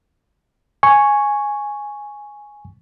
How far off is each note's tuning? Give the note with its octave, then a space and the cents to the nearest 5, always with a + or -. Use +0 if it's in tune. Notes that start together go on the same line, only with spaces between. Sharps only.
G#5 +0 C#6 +0